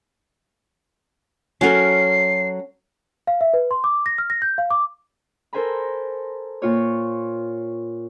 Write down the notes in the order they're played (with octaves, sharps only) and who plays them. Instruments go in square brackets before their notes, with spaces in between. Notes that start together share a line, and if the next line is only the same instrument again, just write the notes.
[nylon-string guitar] F#3 F#4 A4 [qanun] C#4 A#4 [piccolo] C7
[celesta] F5
E5
B4
C6
D6
A#6
F6
A#6
G6
F5
D6
[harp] A4 A#4 C5 G#5 A#5 B5
A#2 F4 C#5